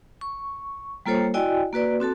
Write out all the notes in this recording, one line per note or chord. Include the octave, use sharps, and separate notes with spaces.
C#6
G3 A#3 F4 A4 C5 C#5
E4 F#4 D5 D#5 G5 G#5
A#3 F#4 B4 D5
C4 F#4 A4 A5